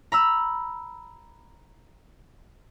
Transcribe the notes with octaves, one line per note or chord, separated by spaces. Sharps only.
A#5 B5 E6